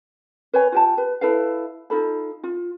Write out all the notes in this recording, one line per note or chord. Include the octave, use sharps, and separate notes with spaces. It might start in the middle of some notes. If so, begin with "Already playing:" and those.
B4 C#5 G#5
F4 G4 A5
B4
E4 A4 B4 F5
D#4 F4 A4 B5
F4